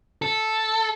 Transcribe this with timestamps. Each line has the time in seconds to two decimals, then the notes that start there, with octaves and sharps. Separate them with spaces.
0.22 A4